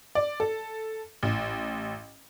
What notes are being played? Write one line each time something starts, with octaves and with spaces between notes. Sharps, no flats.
D5
A4
A1